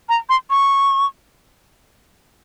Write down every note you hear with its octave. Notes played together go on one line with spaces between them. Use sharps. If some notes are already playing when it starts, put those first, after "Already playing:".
A#5
C6
C#6